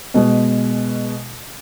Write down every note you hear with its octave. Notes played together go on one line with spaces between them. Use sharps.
B2 G#3